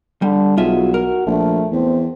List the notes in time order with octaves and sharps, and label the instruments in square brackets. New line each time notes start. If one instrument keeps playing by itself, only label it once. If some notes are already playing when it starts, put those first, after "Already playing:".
[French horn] D3 [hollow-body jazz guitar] G3
[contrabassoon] B1 [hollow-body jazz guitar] F4 G#4 E5 [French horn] F#4
[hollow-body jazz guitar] A#4
[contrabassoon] A#1 [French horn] A3
[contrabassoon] E2 [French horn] C4